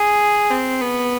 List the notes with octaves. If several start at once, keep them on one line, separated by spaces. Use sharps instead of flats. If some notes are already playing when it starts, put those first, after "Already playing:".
Already playing: G#4
C4
B3